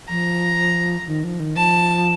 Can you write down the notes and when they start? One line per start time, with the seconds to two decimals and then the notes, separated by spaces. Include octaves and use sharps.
0.09 F3 A#5
1.07 D#3
1.24 F3
1.40 D#3
1.56 F3 A5